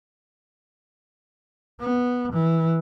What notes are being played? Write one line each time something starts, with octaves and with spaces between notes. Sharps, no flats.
B3
E3